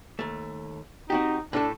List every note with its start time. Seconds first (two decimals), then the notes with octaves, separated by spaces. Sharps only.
0.19 D#2 A3
1.10 C4 D#4 F#4 G4
1.53 A2 A3 D4 A4